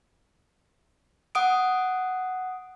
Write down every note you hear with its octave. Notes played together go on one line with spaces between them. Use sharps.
F#5 D#6 D7